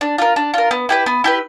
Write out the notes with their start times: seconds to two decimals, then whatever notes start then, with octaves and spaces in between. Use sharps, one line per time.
0.01 D4
0.18 F4 A#4
0.36 D4
0.54 F4 A#4
0.71 B3
0.89 E4 G4 B4
1.06 B3
1.24 E4 G4 B4